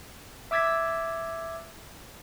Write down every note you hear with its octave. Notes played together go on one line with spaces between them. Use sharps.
E5 D6 E6 G#6 A6 B6